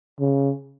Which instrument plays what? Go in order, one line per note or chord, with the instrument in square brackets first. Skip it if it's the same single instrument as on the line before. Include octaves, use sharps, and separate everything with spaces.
[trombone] C#3